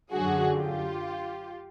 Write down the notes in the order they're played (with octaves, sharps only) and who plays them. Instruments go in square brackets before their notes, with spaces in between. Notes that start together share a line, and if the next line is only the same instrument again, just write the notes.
[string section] F#2 D3 F#3 F#4 G#4
F4 G4